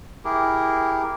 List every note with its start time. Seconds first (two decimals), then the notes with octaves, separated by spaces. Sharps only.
0.25 E4 G4 G#4 A#4